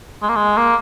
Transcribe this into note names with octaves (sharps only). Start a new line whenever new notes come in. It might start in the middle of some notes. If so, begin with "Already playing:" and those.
G#3
A#3
G#3
A#3